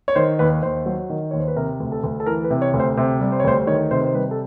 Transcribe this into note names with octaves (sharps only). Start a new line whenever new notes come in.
C#5
D#3 C5
D#2 B4
D#2 C5
F#3
D#3
D#2 C#5
C5
B4
C3 A#4
D2
A4
D2
A4
E3 A#4
B4
C3
C#5
D2
C5
C3 C5
G3
C5
C#5
D2 C5
D#3 C#5
C3 C5
B4
C5
G3 B4
A4